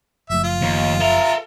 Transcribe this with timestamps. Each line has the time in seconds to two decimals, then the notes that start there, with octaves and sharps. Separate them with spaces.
0.30 F#1 F3 A3 E5
0.44 F4
0.61 D#2
1.01 A4 E5 A#5